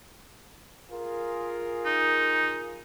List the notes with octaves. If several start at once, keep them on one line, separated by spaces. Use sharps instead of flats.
F4 G#4 A#4
D#4